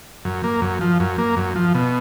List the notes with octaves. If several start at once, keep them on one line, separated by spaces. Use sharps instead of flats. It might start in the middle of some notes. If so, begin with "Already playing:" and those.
F#2
A#3
F#2
F3
F#2
A#3
F#2
F3
B2